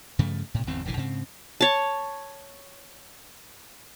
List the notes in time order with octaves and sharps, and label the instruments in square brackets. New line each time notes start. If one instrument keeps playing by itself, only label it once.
[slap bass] G2 C#3 F3 A3
A2 C3
G1 E2 G#2 C4
F1 A#1 D3 E3
G#2 C#3 C4
[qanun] C#5 A5